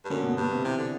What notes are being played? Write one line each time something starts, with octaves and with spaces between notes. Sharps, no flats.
G2
F#2 D3
B2
G2 B2
C3
C3 E3
D3